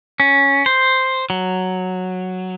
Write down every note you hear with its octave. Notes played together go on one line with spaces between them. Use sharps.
C#4
C5
F#3